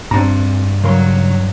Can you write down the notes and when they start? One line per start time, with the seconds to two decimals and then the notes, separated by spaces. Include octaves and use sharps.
0.11 G2 C4 D4 A#5
0.84 C#3 F#3 A#4 C6